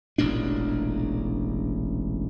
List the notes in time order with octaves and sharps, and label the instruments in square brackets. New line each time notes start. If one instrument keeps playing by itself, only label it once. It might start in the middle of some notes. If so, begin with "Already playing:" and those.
[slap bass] E1 A1 A#2 D4